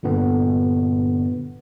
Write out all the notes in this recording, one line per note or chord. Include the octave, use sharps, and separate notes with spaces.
G2 A#2 D3 B3